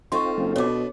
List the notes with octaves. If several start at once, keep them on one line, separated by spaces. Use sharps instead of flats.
C4 D#4 F4 A4 C5 C6 C#6
F#1
B2 B3 D4 C#5 D6